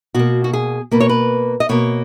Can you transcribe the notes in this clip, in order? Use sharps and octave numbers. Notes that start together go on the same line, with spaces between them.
B2 A#3 F#4
F#4
G#4
B2 A#3 B4
C#5
B4
D#5
B2 A#3 C#5